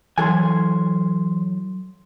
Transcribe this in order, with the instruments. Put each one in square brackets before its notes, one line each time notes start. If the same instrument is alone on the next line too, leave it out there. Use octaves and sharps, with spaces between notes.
[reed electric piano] E3 C6 [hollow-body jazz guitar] F#3 A4 G#5